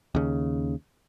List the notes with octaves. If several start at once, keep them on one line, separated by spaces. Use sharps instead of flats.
D#2 C#3